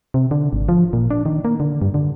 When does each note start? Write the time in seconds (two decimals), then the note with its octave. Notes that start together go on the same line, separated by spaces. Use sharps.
0.14 C3
0.31 D3
0.53 G#1
0.69 F3
0.93 A#2
1.10 D4
1.25 D#3
1.45 A#3
1.60 D3
1.82 G2
1.94 D3